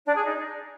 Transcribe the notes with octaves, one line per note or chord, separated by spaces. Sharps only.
D4
G#4
D#4